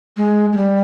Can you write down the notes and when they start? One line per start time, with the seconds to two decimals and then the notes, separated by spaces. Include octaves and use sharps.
0.17 G#3
0.52 G#3
0.57 G3